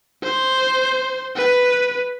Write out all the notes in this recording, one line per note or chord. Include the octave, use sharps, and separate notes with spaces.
C5
B4